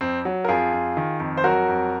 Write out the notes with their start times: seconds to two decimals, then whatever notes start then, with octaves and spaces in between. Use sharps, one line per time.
0.01 F2 C4
0.25 F#3
0.45 A#4
0.48 F2 F4 G#4
0.73 F2
0.97 D#3
1.20 F2
1.37 C5
1.44 F#3 F#4 A#4
1.68 F2